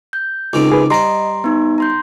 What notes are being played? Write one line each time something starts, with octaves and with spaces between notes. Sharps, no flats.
G6
C#2 D#3 C4 D6
G#4 B4
G3 C5 D#5 A#5 C6
B3 D#4
A#5 C6 G6